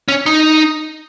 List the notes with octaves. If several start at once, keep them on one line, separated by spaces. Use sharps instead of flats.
C#4
D#4